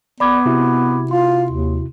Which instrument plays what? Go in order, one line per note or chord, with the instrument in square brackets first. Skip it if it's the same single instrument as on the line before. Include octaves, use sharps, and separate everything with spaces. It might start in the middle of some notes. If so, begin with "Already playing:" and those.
[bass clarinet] B3 [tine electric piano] D5 [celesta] B5 D6 G#6
[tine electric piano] C3 E4 F#4
[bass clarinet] F4 [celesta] C6
[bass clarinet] D#2